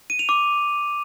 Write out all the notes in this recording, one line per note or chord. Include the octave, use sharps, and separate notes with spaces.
D#7
F7
D6